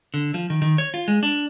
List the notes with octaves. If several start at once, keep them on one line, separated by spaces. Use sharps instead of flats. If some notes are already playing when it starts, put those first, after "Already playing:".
D3
F3
D#3
D#3
C#5
F4
G#3
D4